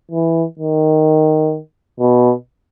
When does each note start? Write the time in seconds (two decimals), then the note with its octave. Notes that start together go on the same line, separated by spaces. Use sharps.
0.11 E3
0.59 D#3
2.00 B2